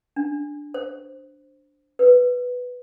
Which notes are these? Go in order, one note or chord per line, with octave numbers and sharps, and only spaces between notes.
D4
C5
B4